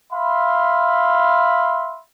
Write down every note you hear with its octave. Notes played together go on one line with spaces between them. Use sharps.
E5 F5 B5 C6